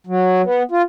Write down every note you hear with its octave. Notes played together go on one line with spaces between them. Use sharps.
F#3
B3
F4